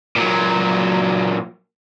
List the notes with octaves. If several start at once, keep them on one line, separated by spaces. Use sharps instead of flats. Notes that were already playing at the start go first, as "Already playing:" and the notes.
A#2 F#3